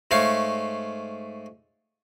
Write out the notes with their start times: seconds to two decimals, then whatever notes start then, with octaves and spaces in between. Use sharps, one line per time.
0.11 G#2 A3 C#5 F5